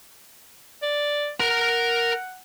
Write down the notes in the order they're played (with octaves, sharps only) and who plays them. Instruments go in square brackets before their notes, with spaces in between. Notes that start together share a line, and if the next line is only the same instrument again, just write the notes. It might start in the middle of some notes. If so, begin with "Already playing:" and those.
[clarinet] D5
[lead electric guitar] A#4 A#5 [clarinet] F#5